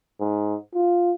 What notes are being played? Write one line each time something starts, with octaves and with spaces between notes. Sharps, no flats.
G#2
F4